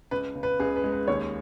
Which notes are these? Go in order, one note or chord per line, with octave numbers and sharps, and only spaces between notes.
C#2 B4
C#3
B4
C#2 G#4
B4
G#3
B4
D#2 C#5